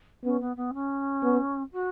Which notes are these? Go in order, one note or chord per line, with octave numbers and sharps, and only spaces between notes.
B3 C#4
B3
B3
C#4
B3
F#4